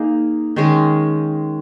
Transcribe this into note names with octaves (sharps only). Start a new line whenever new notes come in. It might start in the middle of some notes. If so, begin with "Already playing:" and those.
Already playing: A#3 D#4 G#4
D#3 G#3 C#4 G#4